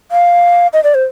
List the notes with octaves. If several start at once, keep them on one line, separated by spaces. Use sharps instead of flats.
F5
D#5
D5
C5